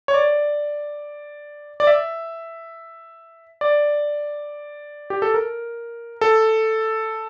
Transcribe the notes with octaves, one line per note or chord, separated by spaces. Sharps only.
C#5
D5
D5
E5
D5
G4
A4
A#4
A4